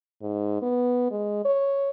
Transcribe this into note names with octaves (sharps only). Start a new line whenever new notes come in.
G#2
B3
G#3
C#5